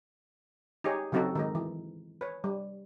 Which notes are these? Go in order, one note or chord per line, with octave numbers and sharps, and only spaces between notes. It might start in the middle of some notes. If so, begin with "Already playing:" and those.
D#4 G4 G#4 C#5
C#3 F#3 C4 D#4 F#4 A4
D#3 G#3 D#4
E3
B4 C#5
G3